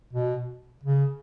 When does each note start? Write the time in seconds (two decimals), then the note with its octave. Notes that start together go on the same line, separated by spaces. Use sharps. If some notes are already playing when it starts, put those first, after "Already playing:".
0.13 B2
0.83 C#3